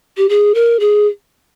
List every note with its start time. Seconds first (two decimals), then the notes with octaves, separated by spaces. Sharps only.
0.17 G4
0.29 G#4
0.55 A#4
0.80 G#4